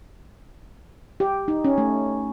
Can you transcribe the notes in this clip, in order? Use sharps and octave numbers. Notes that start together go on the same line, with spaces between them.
G4
D#4
C#4
A3